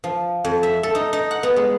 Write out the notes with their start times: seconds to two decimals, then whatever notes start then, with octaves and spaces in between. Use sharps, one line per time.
0.04 F3
0.44 F2
0.63 E5
0.83 A4
0.95 D#4
1.13 D#4
1.31 F#5
1.43 B3
1.56 G#3